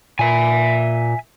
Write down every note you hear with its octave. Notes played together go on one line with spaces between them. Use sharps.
A#2 E5 G#5